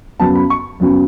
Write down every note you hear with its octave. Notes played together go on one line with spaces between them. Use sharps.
F#2 C#3 F#3 B3 A5
B5
C#6
F#2 C#3 F#3 B3